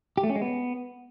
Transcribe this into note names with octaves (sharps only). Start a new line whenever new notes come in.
G4
A3
C#4
G#3
B3